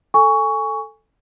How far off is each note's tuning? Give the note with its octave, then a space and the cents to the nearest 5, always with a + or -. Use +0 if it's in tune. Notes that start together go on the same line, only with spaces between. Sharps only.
A4 +0 G#5 -10 C#6 +15